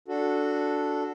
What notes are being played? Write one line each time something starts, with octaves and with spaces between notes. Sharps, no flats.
D4 F#4 A4